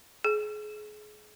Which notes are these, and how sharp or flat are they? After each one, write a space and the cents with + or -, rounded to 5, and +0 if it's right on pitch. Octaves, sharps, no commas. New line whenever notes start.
G#4 +30